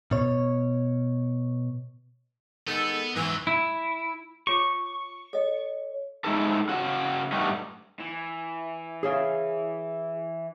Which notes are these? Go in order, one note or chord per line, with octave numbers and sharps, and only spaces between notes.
B2 C#5
D#3 G#3 B3 A4
G#2 E3 F#3
E4 E6
F4 C#5 C#6 D6
A4 C#5 D#5
G#3 D#4 E4 G#4 A4
C#3 F#4
G2 G3 A3 D#4 F#4
E3
G#4 C#5 F5